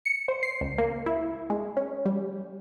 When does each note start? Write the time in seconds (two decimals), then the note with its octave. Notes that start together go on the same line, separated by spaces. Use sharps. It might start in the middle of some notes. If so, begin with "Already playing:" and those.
0.05 C#7
0.28 C5
0.43 C7
0.61 C#2
0.78 A#3
1.06 E4
1.50 G#3
1.77 C#4
2.05 G3